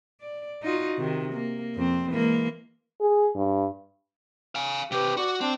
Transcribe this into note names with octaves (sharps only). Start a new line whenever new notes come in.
D5
D#4 F4 F#4
C3 D#3
A#3
F2 C4
E3 G#3 A#3
G#4
G2
F5 G#5
C3 G4 B4
F#4 D5
C4 D4